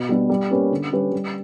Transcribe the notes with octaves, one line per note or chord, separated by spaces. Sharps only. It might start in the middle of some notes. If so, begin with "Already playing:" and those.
Already playing: B2
G3 B3 D4
G3
A#3 C#4 G4 B4
D3
G3 C#4 G4 B4
G3